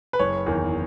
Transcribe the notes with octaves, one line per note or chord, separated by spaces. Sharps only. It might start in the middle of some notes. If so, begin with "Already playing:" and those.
B4
F#1 C#5
E2 D#3